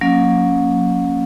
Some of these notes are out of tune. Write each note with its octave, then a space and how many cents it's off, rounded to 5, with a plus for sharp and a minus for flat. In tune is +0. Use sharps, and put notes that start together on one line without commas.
F#3 -45 A#3 +0 C#4 +0